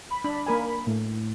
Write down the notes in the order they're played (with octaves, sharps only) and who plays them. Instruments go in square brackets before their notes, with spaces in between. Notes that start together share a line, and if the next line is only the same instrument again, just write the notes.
[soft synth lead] B5
[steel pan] D4 [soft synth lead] B5
[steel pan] A#3 A#4 G#5
[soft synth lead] A2